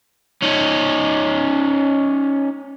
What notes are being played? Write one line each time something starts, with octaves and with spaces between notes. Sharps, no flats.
C#4 D#4